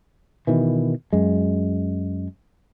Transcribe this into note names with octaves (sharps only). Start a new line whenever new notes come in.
B2 D#3 E3
F#2 G#3